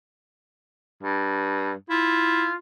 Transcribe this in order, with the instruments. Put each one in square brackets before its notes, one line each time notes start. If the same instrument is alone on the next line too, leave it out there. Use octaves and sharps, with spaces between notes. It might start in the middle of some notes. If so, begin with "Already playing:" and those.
[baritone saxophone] G2
[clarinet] E4 [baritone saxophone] F4